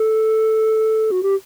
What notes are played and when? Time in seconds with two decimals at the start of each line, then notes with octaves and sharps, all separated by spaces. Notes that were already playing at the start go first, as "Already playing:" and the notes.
Already playing: A4
1.11 F#4
1.23 G4